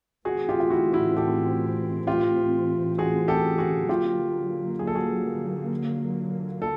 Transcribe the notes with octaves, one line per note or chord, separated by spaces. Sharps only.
A2 E3 A3 C4 F#4 G#4
F4 G4
F4
E4 F#4
E4 F#4
G4 A4
F4 G4
F#4 G#4
G4 A4
F#4 G#4
D3 F#3 A#3 F4 G4
G#4
A4
F#4 G#4
A4